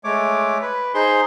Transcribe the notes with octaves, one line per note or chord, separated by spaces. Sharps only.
G#3 A3 C#5 D6
B4
D#4 G#4 C5 C6